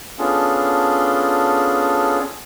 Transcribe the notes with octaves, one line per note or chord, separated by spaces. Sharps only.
B3 C#4 D4 F4 G#4 A4